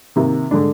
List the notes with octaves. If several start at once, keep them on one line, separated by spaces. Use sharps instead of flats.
C3 D#3 A#3
D3 G#3 D4